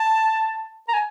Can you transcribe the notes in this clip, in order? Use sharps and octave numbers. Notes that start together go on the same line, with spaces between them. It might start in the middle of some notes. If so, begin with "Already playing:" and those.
Already playing: A5
A#5
G#5